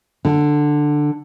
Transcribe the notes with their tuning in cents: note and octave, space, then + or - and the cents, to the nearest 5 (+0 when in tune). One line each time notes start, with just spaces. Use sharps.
D3 +10